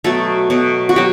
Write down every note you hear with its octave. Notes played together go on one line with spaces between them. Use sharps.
B2 F#3 A3 A4
B2 F#3 A3
F#4
B2 F#3 G4